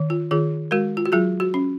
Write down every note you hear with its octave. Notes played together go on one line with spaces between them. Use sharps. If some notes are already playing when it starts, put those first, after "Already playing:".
Already playing: D#3
F4
D#3 F4 G#4
G#3 F#4 A#4
F4
F#4
F#3 F4 G#4
F#4
C#4